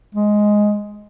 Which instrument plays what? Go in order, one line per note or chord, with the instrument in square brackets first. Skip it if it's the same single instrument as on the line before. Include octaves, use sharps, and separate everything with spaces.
[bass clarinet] G#3